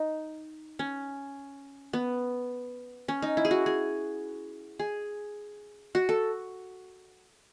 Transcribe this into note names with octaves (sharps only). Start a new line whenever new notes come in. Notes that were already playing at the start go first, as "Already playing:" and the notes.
Already playing: D#4
C#4
B3
C#4
D#4
E4
G#4
F#4
G#4
G#4
F#4
A4